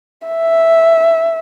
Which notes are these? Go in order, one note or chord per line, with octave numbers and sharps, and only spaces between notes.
E5